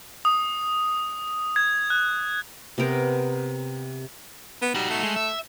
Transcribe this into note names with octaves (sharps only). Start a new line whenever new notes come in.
D#6
G#6
F#6
C3 B3 A#4 C5
B3
G3 D#4 F#4
A3
G#3
E5